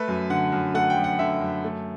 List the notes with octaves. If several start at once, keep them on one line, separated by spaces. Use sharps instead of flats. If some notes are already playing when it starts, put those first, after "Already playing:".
Already playing: A3 B4
F#2
D3 F#5
F#2
A3 F#5
G5
F#2
F#5
D3 E5
F#2
A3